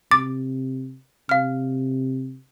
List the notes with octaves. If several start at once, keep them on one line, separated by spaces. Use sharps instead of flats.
C3 D6 A6
C3 F5 F6